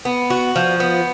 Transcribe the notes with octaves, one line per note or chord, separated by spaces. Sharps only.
B3
F#4
F3
B3